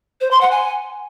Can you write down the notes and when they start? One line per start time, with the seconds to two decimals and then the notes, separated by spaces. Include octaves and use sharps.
0.21 C5
0.31 C6
0.41 F#5
0.51 G#5